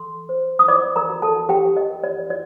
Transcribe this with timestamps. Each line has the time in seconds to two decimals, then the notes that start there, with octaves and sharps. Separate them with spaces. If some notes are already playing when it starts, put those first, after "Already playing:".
Already playing: A4 C6
0.29 C5
0.59 D#6
0.68 C5 D5 D6
0.96 A#4 A#5
1.10 F#4
1.22 A4 A5
1.49 G4 G5
1.77 D#5
1.90 A#4
2.04 D5
2.30 F#4 D5